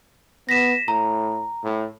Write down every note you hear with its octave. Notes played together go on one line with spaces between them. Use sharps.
B3 A#6 B6 E7
A2 A#5
A2